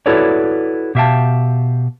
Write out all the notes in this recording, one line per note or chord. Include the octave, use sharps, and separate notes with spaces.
E4 F#4 A4 B4 C#5 D5
B2 G4 E5 F5 G5 A5